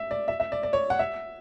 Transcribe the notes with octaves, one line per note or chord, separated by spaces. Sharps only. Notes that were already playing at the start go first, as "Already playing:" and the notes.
Already playing: E5
D5
E5
E5
D5
D5
C#5
F#5
E5